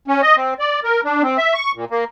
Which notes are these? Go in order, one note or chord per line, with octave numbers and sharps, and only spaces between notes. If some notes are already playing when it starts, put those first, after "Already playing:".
C#4
D#5
C4
D5
A#4
D4
C4
E5
C#6
A#2
A#3